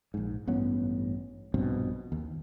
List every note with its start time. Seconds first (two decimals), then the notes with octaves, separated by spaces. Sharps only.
0.14 A#1 G#2
0.47 A1 G2 B3 C#4
1.54 A#1 G2 B2 C4
2.12 D#2